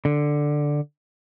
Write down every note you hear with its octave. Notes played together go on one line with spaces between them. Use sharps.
D3